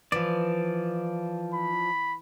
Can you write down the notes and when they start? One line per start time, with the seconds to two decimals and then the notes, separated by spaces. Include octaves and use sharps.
0.12 E3 F3 D5
1.54 B5